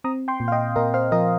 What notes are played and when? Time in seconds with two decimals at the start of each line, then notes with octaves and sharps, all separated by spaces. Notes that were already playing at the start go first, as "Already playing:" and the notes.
0.04 C4 A#5 D#6
0.28 G5 C6
0.40 A#2
0.48 F5
0.52 D#5 G5
0.76 A#2 A#4 D#5
0.94 C5 F5
1.12 F3 A#4 D#5